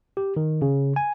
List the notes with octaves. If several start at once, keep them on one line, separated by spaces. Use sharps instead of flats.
G4
D#3
C#3
G#5